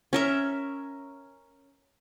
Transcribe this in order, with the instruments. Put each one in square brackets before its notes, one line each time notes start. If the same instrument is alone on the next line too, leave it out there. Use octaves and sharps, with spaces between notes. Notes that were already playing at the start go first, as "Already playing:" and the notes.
[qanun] C#4 A#4 E5